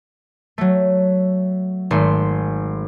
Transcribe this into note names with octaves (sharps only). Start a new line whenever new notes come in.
F#3 A3
G#1 A3 C6